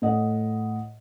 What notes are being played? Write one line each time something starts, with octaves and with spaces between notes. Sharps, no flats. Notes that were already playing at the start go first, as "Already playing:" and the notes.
A2 D#5 F#5